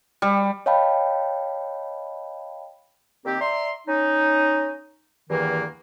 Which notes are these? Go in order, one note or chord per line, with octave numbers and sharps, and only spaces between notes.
G3
C#5 D#5 F5 G5 A5 B5
D#3 A#3 C4 G4
D5 E5 A#5 C6
C#4 D#4
E2 G2 D#3 E3 A#3